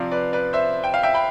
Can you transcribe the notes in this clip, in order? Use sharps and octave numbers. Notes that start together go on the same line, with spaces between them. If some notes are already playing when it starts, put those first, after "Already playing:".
Already playing: C3 F3 D5 F5
B4 D5
B4 D5
C5 E5
G5
F5
E5 G5
G5 B5